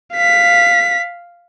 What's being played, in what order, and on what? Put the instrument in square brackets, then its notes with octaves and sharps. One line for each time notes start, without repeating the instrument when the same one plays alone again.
[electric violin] F5 B6